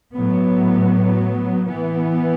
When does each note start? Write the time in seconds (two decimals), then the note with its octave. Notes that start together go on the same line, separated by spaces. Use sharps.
0.15 A2 F#3 B3
1.67 E3 B3